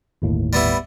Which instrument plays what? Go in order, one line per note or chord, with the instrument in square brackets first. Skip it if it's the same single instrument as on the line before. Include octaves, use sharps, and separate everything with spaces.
[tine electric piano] G1 D#2 A2
[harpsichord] G3 B3 E4